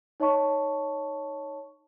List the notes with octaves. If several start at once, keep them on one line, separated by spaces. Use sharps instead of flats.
D#4 C#5 D#5 A5 C#6